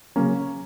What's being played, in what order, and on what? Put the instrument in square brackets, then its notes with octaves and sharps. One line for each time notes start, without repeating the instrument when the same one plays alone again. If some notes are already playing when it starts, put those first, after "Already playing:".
[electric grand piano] C#3 F#3 A#3 C#4 A#5